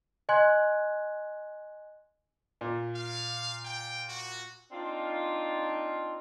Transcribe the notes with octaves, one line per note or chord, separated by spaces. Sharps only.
D#5 G#5 C6 F#6 G#6
A#2
F5
G5
F#4
C4 D4 D#4 F4